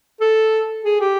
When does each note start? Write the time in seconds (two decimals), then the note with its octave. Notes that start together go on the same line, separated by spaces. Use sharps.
0.21 A4
0.85 G#4
1.00 G4